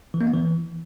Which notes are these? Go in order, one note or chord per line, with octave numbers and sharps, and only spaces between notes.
E3
A#3
B3
E3